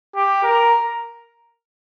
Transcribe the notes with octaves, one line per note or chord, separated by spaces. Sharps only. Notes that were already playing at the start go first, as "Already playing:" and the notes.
G4
A#4